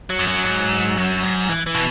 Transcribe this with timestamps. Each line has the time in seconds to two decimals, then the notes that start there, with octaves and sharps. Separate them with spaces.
0.10 F#3
0.19 F#2
0.27 F#3
0.45 G#2
0.97 F#2
1.23 G#2
1.49 E3
1.66 E3
1.75 B2